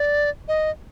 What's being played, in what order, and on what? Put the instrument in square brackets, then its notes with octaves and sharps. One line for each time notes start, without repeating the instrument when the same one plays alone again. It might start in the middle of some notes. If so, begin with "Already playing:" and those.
Already playing: [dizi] D5
D#5